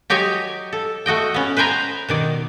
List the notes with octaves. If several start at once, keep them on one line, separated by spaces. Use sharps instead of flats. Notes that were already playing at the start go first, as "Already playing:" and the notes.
F#3 G4 C#5 D#5 G#5
A4
A3 F#4 D#5 G5
B3 C#4
B4 C5 G5 G#5 A#5
B2 D#3 D5